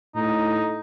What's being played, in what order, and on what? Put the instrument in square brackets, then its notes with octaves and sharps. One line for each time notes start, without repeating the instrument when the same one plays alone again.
[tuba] A2 [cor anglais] D#4